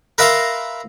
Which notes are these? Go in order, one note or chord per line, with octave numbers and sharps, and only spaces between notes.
A#4 B4 E5 F5 A#5 C6